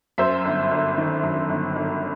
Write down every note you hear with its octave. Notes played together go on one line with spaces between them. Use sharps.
F#2 C5 E5
G1
G1
D#3
F#2
G1
G1